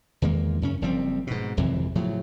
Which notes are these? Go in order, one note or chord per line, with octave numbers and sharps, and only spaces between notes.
E2 D#3 G#3 A#3
F#2 C#3 C#4
F#1 F3 G3 C4
G#2 B2
G#1 F2 C3 E3
A2 C#3 F3 F#3